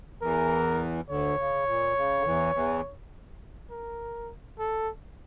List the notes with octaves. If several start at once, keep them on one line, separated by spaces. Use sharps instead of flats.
E2 E3 A#4
D2 D3 C#5
C#3
A#2
C#3
D3
E2 E3
E2 E3
A#4
A4